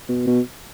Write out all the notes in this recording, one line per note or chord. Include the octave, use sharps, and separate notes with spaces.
B2
B2